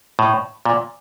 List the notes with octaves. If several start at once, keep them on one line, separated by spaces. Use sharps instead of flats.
A2
A#2